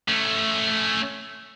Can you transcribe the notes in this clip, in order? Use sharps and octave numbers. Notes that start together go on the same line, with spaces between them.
A3 C#4